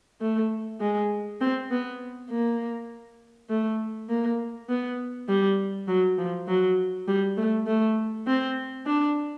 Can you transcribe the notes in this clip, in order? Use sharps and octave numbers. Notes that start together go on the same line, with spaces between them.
A3
G#3
C4
B3
A#3
A3
A#3
B3
G3
F#3
F3
F#3
G3
A3
A3
C4
D4